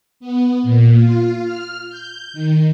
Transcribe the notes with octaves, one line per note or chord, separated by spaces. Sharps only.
B3
A#2
F4
F6
G6
D#3